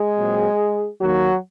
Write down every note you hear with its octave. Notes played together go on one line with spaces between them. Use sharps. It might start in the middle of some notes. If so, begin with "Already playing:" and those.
Already playing: G#3 G#4
A#2 F#3 C4
D#2 D#3 F#3 A#3 F#4